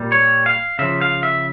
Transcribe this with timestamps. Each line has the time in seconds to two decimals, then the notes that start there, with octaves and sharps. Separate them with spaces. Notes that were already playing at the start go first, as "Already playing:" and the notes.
Already playing: A#2 G3
0.12 C#5
0.46 F5
0.79 C#3 F3 E5
1.01 F5
1.23 E5